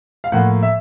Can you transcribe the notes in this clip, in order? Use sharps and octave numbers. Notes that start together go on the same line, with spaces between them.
F5
A2 F3 A#3 F#5
E5